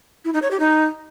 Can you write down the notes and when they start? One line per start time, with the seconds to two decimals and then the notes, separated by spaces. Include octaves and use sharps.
0.25 E4
0.33 D#4
0.42 C#5
0.51 G4
0.60 D#4